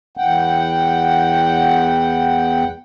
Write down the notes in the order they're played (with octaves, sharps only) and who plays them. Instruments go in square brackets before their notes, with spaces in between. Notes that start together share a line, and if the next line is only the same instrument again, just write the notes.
[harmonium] E2 F#5 G5